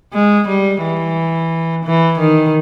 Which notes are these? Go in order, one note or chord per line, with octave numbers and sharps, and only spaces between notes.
G#3
G3
E3
E3
D#3